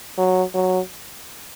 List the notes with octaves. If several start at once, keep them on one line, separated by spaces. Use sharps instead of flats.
F#3
F#3